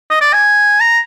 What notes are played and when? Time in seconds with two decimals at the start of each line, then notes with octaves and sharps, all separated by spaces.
0.10 D#5
0.21 D5
0.34 G#5
0.81 A#5